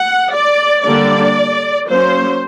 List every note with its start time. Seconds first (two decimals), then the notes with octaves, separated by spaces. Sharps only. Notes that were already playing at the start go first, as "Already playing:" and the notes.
Already playing: F#5
0.33 D5
0.84 D3 G3 A#3 D4 D5
1.89 F#3 A#3 C#4 C5